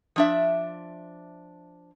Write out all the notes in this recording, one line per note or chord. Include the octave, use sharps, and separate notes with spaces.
F3 D4 E5